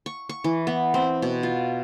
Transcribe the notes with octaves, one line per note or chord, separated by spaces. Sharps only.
C#6
C#6
E3
B3
C4
B2
F4